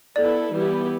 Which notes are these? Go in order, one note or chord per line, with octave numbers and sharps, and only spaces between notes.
B3 E4 A4 D5
E3 G3 B3 E4 G4